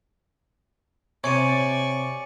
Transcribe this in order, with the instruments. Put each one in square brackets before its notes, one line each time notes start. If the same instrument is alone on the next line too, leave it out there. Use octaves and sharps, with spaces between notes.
[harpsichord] C3 [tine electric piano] C#5 [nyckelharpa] D5 C#6 [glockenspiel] G#5 C#7 D#7